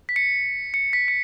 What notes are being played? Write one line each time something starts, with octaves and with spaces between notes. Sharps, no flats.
B6
C#7
C#7
B6
C#7